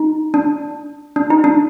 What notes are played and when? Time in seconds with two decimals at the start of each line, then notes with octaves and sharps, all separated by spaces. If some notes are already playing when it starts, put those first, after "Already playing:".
Already playing: D#4
0.34 D4
1.16 D4
1.30 D#4
1.44 D4